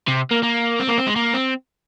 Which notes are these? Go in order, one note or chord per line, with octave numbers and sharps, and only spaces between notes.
C3
A#3
A#3
C4
A#3
C4
G#3
A#3
C4